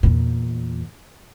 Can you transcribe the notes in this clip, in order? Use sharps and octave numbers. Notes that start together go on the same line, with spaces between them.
E2 A#2